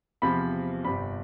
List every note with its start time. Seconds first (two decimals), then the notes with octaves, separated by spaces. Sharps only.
0.22 E2 C3 F3 B5
0.84 G1 F2 C3 G3 B5